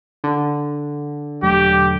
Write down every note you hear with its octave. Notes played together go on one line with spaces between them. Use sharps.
D3
E1 F#3 A3 G4